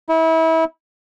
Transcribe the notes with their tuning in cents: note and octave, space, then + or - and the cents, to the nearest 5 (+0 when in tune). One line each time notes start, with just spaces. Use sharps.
E4 -30